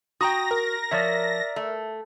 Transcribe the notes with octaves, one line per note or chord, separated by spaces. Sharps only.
F#4 G5 A#5 D#6 A#6
A#4
F3 C#5 D5 E5
A3